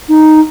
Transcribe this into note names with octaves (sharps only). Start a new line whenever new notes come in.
D#4